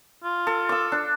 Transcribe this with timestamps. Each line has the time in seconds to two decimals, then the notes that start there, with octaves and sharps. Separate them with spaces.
0.24 F4
0.47 A4
0.69 D6 E6
0.92 D4